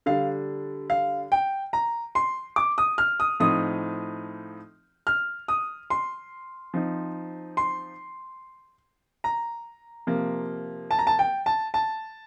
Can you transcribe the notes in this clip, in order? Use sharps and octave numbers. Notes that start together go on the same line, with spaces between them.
D3 G3 D4 F5
F5
G5
A#5
C6
D6
D#6
F6
D#6
A2 F3 C4 D#4 D#6
F6
D#6
C6
F3 C4 D#4
C6
A#5
C3 F3 A#3
A5
A#5
A5
G5
A5
A5